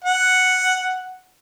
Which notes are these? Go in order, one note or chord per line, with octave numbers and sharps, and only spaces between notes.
F#5